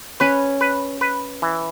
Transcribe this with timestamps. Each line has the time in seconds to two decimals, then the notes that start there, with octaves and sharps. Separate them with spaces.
0.20 C#4 B4
0.61 B4
1.01 B4
1.42 E3